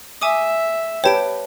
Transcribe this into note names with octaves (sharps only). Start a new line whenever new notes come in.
E5 G#5 D6 D#6
G4 B4 C#5 G5 A5 D7